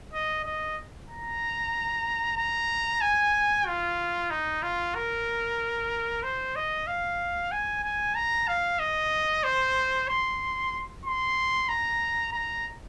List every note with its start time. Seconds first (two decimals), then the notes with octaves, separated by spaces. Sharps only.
0.14 D#5
0.45 D#5
1.10 A#5
2.38 A#5
3.01 G#5
3.67 F4
4.31 D#4
4.63 F4
4.95 A#4
6.23 C5
6.56 D#5
6.87 F5
7.52 G#5
7.84 G#5
8.15 A#5
8.48 F5
8.80 D#5
9.44 C5
10.09 C6
11.05 C6
11.69 A#5
12.33 A#5